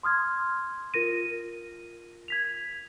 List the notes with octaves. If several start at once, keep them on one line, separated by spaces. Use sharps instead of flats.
C6 D#6 F6 G#6
F4 A#4 A#6 D#7
G#6 B6 F7